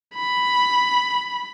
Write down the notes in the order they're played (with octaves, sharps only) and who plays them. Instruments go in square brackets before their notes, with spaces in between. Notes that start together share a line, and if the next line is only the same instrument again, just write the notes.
[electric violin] B5